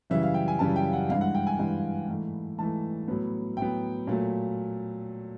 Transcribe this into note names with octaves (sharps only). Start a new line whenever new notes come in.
F#2 C#3 E3 G3 E5
F5
G5
G#5
F#2 C#3 E3 G3 A5
G5
F#5
G2 E3 G#3 F5
F#5
G5
G#5
G2 E3 G#3
G#2 E3 A3
G#2 E3 A3 A5
A2 F#3 B3
A2 F#3 B3 G5
A#2 F#3 A3